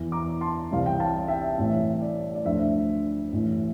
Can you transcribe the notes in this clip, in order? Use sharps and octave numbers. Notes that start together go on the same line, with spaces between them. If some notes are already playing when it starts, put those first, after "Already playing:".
Already playing: E2 E3
A#5 D6
A5 C6
C2 C3 E3 F5
G5
F5 A5
E5 G5
A1 A2 E3 E5
D5
D5
D2 D3 F3 E5
A1 A2 E3